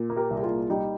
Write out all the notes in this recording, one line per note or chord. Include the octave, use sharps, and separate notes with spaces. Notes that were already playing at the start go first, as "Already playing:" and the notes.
Already playing: A#2
A#3
G4 A#4
C2
G4
F4 G#4
A#2
G3 D#4 G4